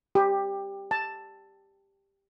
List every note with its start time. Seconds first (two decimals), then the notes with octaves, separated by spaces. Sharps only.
0.15 G4
0.91 A5